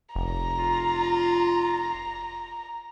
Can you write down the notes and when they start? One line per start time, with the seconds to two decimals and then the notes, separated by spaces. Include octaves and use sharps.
0.16 F1 A#5
0.58 F4